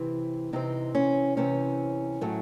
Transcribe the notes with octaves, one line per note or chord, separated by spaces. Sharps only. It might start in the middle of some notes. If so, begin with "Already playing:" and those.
Already playing: C3 E3 C4
C3 E3 C4 D#4
C#4
C3 E3 C4 C#4
A2 F#3 A3